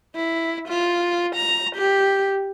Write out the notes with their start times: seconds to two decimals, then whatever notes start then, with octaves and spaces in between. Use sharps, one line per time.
0.16 E4
0.68 F4
1.35 A#5
1.76 G4